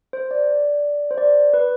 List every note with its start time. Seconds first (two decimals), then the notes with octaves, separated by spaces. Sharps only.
0.13 C5
0.31 D5
0.47 D5
1.11 C5
1.18 D5
1.54 B4